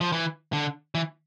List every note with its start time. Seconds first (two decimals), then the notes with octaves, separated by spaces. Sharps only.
0.01 F3
0.12 E3
0.53 D3
0.95 E3